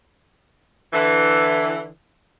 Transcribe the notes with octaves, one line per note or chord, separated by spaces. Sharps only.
D3 E3